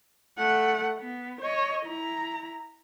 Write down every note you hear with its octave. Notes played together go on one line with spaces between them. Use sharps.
A3 F#5
B3
C#5 D#5
E4 A#5